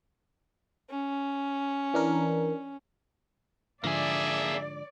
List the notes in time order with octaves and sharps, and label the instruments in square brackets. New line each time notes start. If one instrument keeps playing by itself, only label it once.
[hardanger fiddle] C#4
[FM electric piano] E3 D4 A#4
[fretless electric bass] G#2 D3 F3 [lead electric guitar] A#3 G#4 [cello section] D5 [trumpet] E5